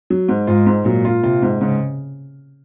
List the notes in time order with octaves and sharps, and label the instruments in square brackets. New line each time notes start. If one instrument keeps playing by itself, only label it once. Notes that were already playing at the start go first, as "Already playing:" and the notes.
[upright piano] F#3
G#2
[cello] G#2 [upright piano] F4
[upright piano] G#2
[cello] A#2 [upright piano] F#3
[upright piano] F4
[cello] C3 [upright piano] F4
[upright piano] G#2
[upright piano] G#2 [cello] C#3